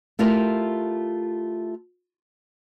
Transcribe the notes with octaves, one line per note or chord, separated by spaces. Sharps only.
A3 E4 F4 G4 A#4